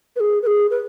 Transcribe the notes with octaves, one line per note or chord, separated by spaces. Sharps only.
B4
G#4
B4
G#4
B4